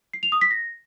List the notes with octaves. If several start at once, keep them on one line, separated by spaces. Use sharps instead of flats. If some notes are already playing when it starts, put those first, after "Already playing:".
C7
F7
D#6
B6
A#6